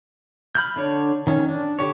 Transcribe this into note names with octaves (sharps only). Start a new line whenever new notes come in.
B5 F6 G6
D3 D4 C#5
D#3 C#4
D4
D3 G4 C#5